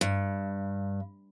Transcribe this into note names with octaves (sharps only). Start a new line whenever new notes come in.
G2